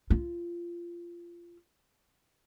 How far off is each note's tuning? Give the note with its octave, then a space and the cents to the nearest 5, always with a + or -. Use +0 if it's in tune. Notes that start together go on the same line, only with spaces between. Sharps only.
F4 -20